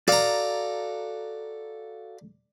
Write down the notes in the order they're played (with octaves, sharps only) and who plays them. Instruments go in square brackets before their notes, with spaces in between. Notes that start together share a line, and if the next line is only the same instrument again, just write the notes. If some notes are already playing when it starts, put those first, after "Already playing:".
[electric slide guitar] F#4 A4 F5 [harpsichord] D5 A#5